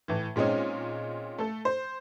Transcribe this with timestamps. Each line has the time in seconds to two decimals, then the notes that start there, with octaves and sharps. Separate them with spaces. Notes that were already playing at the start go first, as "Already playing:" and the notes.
0.08 A2 E3
0.36 A#2 G#3 C4 C#4 D#4
1.38 A3 A4
1.65 C5